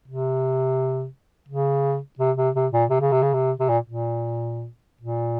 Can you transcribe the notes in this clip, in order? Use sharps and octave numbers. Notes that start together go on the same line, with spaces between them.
C3
C#3
C3
C3
C3
A#2
C3
C#3
C3
C#3
C3
C3
A#2
A#2
A#2